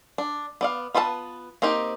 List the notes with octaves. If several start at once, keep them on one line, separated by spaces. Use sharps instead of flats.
D4
B3 D5 F5
B3 F4 B4 F5 A5
A#3 C4 D#4 G4